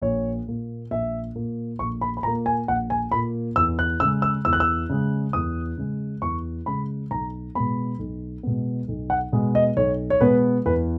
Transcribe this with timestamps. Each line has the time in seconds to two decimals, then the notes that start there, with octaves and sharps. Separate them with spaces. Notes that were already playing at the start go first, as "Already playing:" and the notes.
0.01 A#1 C#5
0.47 A#2 A#3
0.91 A#1 E5
1.35 A#2 A#3
1.79 A#1 C#6
2.01 B5
2.17 B5
2.23 A#2 A#3 A#5
2.46 G#5
2.68 A#1 F#5
2.90 G#5
3.12 A#2 A#3 B5
3.56 E2 E6
3.79 F#6
4.00 C#3 G#3 E6
4.22 E6
4.45 E2 E6
4.53 F#6
4.60 E6
4.90 C#3 G#3
5.33 E2 D#6
5.78 C#3 G#3
6.22 E2 C#6
6.66 C#3 G#3 B5
7.11 B1 A#5
7.55 B2 G#3 B3 B5
7.99 B1
8.43 B2 G#3 B3
8.88 B1
9.10 F#5
9.32 B2 G#3 B3
9.55 D#5
9.77 B1 C#5
10.10 C#5
10.21 B2 G#3 B3 B4
10.66 E2 B4